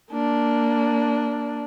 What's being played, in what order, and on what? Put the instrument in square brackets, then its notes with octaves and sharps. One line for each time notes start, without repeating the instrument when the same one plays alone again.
[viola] A#3 D4